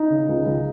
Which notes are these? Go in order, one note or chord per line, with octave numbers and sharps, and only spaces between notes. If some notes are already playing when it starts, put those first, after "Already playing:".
Already playing: D#4
C#3
C#2
C#2